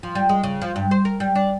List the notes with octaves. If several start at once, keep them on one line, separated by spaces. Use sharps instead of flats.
F3
G3
G#3
C#3
F3
G2
C5
A#4
G3
D4